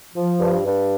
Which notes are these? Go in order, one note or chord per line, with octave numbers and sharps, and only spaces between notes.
F3
G2
G2